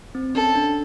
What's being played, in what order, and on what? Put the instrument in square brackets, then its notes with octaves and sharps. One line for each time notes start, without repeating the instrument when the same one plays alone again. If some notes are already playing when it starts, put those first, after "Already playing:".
[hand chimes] C4
[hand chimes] C#4 [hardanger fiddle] A4
[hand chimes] D4